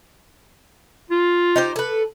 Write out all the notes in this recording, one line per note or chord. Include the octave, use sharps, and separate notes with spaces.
F4
D#4 G4 C5
A4 B4